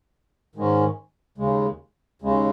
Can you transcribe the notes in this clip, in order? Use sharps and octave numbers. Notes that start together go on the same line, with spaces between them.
G#2 D#3 G#3 C#4
D#2 C#3 G#3
D#2 C#3 G#3